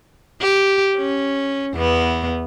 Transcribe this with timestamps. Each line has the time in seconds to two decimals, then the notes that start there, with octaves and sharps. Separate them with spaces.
0.41 G4
0.96 C#4
1.74 E2 B3